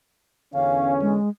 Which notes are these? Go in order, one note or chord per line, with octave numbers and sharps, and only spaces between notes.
E2 D3 C#4 F5
G#3